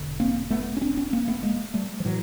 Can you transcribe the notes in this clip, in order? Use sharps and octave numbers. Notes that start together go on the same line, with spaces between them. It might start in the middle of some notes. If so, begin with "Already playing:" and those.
Already playing: E1 D3
A#3 C4
A3 B3
C#4
C4 D4
B3 C#4
A#3 C4
A3 B3
G#3 A#3
G3 A3
F3
A2 E3 F#3